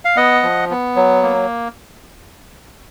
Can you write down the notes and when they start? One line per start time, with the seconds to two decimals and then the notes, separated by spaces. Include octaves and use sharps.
0.05 F5
0.16 B3 D#5 F#5
0.43 F3
0.71 B3
0.96 F#3
1.23 A#3